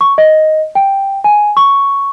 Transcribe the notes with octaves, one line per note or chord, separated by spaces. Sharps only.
C#6
D#5
G5
G#5
C#6